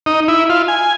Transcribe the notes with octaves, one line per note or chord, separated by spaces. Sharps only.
D#4
E4
F4
G#5